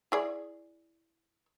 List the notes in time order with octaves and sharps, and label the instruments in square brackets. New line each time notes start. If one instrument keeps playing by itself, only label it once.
[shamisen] E4 G#4 D5